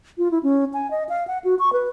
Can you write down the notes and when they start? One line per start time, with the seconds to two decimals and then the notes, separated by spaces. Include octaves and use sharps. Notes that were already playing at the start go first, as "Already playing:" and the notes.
0.18 F4
0.31 E4
0.43 C#4
0.74 G#5
0.91 D#5
1.09 F5
1.27 F#5
1.44 F#4
1.59 C#6
1.73 B4